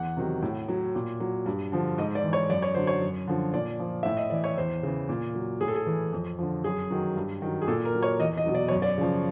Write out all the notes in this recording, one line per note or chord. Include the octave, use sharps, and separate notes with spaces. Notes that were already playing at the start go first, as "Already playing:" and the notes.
Already playing: E2 F#5
C3 D#3 F#3
A2
F#3
A#2
F#3
G2
D3 F3
G#2 D#5
D5
E3
C#5
F#2 D5
C#5
D3 F#3 C5
C#5
F#2
D3 F3
A#2 D5
F3
A2 E5
D#5
E3 D5
C#5
E2 C5
C#3 E3
A#2
F#3
A2 G#4
A4
G#4
E3
F2
D3 F3
F#2 G#4
D#3 F#3
G2
D#3 F#3
G#4
A#2 A4
A#4
F#3
C#5
E2 D#5
D#5
B2 F#3
D5
F#2 C#5
D5
C#3 F3